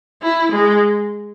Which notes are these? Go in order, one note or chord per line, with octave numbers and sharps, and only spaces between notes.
E4
G#3